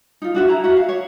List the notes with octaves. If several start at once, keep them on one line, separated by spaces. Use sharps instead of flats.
D#4 F4
D4 F#4 E5
E4 A#5
F#4 E5
F5
C#5